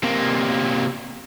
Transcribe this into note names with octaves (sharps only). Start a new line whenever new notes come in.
C3 A#3